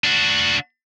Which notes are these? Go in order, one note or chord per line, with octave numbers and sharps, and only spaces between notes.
D4 F#4